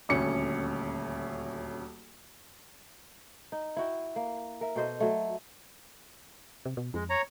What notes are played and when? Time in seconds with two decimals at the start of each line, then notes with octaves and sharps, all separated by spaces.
0.09 D#1 D2 C#4 C#7
3.52 D#4
3.77 E4 F#4 G5
4.16 A#3
4.61 A#4 E5
4.76 B2 A4 C5 D#5
5.00 F#3 A3
6.66 C3
6.77 B2
6.94 F2 G#3
7.10 C#5 A#5